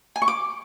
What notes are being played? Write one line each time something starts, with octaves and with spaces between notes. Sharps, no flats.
G#5
C#6
D6